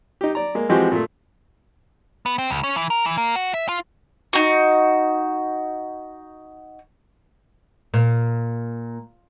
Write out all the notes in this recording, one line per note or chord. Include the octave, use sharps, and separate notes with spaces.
D#4 G4
D5 A#5
G#3 A#3
E3 F3 G#3 C4 F#4 G4
A#2 A3
B3
C4
C#2
C#4
E3
A#4
E3
A#3
F#4
E5
F4
D#4 F#4
A#2